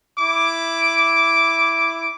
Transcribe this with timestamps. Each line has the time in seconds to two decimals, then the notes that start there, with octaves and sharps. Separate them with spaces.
0.20 E4 D6